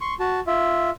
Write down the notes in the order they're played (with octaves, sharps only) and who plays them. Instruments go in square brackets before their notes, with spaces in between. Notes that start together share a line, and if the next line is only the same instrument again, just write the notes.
[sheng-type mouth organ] C6 C#6
F#4 A5
F4 E5